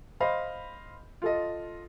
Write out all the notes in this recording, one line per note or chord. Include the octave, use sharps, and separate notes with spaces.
C5 D#5 F5 B5
F4 A4 D#5